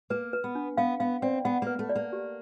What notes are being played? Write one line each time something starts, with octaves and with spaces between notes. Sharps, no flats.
A#3 B4
B4
B3
D4
B3 F5
B3 F5
C4 D5
B3 F#5
A#3 B4
A3
D5
A#3
G4